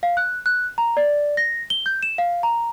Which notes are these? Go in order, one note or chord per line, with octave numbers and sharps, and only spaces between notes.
F5
F#6
F#6
A#5
D5
A#6
G7
G6
E7
F5
A#5